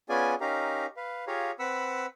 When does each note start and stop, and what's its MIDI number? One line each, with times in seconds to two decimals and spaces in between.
0.09 0.35 59
0.09 0.35 61
0.09 0.35 65
0.09 0.35 68
0.09 0.35 74
0.09 0.35 80
0.41 0.86 61
0.41 0.86 63
0.41 0.86 67
0.41 0.86 70
0.41 0.86 77
0.41 0.86 82
0.97 1.25 71
0.97 1.25 77
1.27 1.51 65
1.27 1.51 67
1.27 1.51 68
1.27 1.51 73
1.27 1.51 77
1.27 1.51 82
1.59 2.06 60
1.59 2.06 71
1.59 2.06 78
1.59 2.06 83
1.59 2.06 88